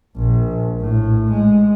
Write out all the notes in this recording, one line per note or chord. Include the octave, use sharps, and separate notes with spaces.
A#1
A2
G#3